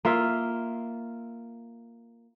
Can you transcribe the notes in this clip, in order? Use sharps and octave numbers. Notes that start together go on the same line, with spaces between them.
A#3 F4 E5 F5